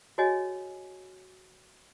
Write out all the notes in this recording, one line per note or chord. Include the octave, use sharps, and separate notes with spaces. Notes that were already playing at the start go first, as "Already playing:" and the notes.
F#4 G#4 C#5 D#5 G#5